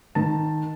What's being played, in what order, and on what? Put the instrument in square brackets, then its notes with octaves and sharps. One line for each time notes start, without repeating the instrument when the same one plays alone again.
[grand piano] D#3 A5